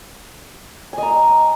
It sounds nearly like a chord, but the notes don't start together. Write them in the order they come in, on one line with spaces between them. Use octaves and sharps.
G#5 D#5 A#5